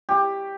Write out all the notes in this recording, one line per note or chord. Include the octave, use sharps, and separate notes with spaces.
G4